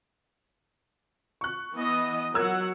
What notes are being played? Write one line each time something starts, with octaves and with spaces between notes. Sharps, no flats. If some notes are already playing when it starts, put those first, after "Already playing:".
C#6 F#6
E3 B3 D#5
F#3 A#4 F#5 E6 G#6